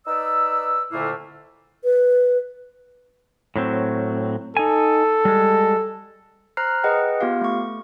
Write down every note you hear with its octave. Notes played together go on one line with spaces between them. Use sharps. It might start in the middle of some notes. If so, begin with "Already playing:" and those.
D#4 B4 D5 E6
F2 A#2 D3 A3 A#3 E4
B4
A2 F#3 C4
D#4 A4 G#5
G3 G#3
C5 A#5 F6 F#6 C7
G#4 B4 D#5 F#5 G5
B3 F4 G4 F5
A3 C#6